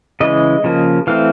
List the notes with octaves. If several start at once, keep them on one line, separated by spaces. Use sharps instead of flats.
C#3 E3 G#3 D#5
C#3 F3 A#3
E3 A3 C4 F5